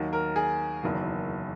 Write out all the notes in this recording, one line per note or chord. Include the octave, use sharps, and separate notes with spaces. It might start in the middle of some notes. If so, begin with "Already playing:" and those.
Already playing: D#2 D#3 F#3
A#4
G#4
F#1 E2 D#3 F#3